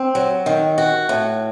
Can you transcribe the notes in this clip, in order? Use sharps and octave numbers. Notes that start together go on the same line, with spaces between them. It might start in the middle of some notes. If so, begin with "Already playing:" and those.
Already playing: C4
F#3
D#3
F#4
A2